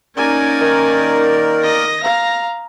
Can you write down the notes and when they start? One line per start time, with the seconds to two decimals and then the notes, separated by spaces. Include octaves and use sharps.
0.17 A#3 C#4 D#4 A#4 D5 G#5
0.61 D#3
1.64 D#5 A#6
2.03 F5 A#5